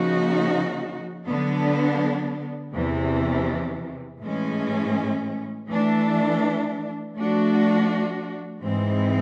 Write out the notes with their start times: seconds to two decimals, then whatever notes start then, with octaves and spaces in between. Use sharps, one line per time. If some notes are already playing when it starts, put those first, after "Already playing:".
Already playing: C#3 F3 A#3 D#4 F#4
1.25 D3 F#3 B3 D4
2.73 E2 C3 E3
4.21 A2 E3 G#3 C#4
5.68 E3 A3 D4
7.16 F3 A3 D4 F#4
8.63 G#2 E3 G#3 C4